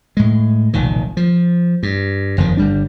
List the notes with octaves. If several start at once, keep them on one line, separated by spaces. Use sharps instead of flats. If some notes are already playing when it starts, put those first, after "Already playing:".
A2 G#3
F1 B1 A#2 D#3
F3
G2
F#1 F2 D#3 F3
G1 G3 D4